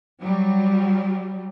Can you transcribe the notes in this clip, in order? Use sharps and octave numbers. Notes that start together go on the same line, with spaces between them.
F#3 G3